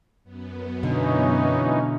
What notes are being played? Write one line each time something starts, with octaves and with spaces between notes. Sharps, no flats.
F#2 B3
B2 D3 E3 C#4 D#4